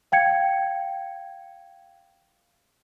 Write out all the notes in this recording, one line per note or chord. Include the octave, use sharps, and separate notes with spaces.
F5 G5 G#6 C#7